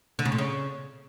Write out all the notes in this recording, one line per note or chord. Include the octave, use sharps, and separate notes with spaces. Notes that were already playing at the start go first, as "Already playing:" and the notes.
D3
C#3
A#2
C#3